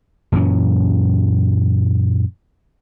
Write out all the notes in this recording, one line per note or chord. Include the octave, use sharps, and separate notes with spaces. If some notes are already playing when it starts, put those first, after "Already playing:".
F#2 A#2 E3 C#4